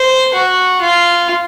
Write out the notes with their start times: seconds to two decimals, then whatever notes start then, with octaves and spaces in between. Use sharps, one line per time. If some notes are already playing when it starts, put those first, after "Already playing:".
Already playing: C5
0.34 F#4
0.81 F4